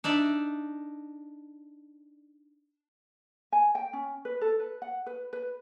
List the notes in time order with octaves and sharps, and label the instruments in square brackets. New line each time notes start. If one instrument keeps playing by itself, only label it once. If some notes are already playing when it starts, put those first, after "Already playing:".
[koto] D4 D#4 D5 E5
[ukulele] G#5
G5
C#4
B4
A4
B4
F#5
B4
B4